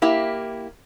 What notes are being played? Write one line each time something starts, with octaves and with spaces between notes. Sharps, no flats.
A#3 E4 G4